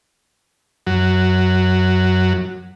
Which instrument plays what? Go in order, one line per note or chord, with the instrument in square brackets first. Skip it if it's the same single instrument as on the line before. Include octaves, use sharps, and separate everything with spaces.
[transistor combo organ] F#2 F#3